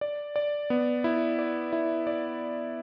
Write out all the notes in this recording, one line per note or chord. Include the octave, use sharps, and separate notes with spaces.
D5
D5
B3
E4
D5
E4
D5